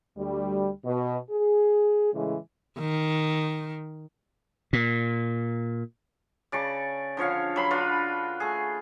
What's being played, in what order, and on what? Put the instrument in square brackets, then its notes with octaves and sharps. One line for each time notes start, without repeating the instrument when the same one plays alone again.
[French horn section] D2 G3
B2
G#4
A2 C#3 E3 G#3
[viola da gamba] D#3
[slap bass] A#2
[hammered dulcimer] C#3 D5 A5 C#6
D3 F3 C#5 F5
F#3 B5 C6
D4 F4 F#4 B4
A3 G#4